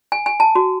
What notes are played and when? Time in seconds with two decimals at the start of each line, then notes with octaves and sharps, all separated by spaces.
0.12 G#5
0.26 G#5
0.40 A5
0.55 F#4